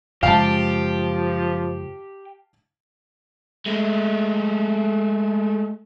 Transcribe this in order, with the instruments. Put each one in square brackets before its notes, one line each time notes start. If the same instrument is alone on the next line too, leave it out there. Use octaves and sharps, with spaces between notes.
[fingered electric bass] F#2 C#3 G#3 [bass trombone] F3 [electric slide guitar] G4 [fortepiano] F5 A5
[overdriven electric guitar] G#3 A3